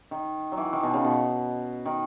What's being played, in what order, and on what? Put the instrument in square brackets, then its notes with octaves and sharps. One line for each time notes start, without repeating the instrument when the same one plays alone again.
[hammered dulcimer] D#3
F#3
E3
D#3
B2
C#3
B2
D#3